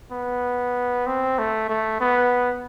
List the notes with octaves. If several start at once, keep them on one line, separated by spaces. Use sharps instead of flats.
B3
C4
A3
A3
B3